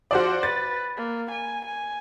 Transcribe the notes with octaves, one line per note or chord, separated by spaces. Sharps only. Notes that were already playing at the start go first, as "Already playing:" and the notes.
F3 F#4 C5 D5
B4 A6
A#3
G#5
G#5